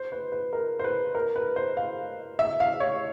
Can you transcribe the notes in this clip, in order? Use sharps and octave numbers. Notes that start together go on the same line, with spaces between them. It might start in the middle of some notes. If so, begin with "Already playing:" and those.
Already playing: C5
B4
B4
A#4
C5
B4
A#4
B4
C5
F5
E5
F5
C#5